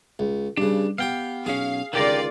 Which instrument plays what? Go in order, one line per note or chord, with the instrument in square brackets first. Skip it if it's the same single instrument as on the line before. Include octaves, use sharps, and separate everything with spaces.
[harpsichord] C#2
[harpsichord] G2 C#3 [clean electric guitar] D4
[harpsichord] B3 G4 [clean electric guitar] F5 G5
[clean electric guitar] B1 C#4 [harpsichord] G#4 [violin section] F5
[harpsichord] C#2 D#3 [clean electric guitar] D3 G4 A#4 [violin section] F4 D5 A6